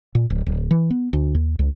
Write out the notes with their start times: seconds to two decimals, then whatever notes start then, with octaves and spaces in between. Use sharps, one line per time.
0.15 A#2
0.30 D1
0.46 D1
0.71 E3
0.90 B3
1.13 D2
1.35 D#2
1.59 C#2